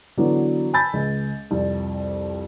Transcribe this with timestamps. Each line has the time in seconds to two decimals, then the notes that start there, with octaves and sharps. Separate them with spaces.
0.18 D3 E3 F#3 B3 D4 E4
0.73 G#5 A5 B5 E6 G6 A6
0.93 C#2
1.51 C2 F2